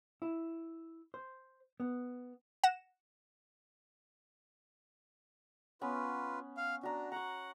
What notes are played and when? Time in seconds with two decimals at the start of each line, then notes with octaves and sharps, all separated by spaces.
0.22 E4
1.14 C5
1.80 B3
2.64 F#5 A#6 E7
5.81 B3 C#4 F4 B4
6.57 F5
6.83 D4 F#4 A#5
7.12 F#5 A#5 C#6